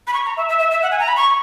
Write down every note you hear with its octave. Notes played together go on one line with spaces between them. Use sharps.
B5
C#6
A#5
E5
E5
E5
E5
F#5
G#5
A#5
B5
C#6